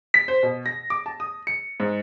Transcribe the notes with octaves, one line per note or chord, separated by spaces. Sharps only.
B6
C5
B2
A#6
D6
A5
D#6
C#7
G#2